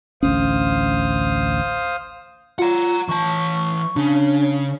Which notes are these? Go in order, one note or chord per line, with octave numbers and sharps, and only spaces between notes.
A1 D2 C#4 C5 F5 D#6
F4 F#5 A#5
E3 A5 C#6
C#3 D4